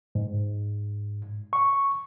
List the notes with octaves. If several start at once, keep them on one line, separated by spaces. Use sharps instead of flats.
G#2
C#6